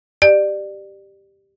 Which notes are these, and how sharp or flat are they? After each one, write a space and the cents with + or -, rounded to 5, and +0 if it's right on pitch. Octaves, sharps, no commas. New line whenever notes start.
G4 +0 D5 +25